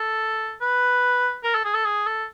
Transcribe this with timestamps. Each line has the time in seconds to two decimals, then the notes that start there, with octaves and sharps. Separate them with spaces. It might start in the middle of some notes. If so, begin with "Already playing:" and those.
Already playing: A4
0.61 B4
1.44 A#4
1.55 A4
1.65 G#4
1.74 A4
1.85 G#4
2.06 A4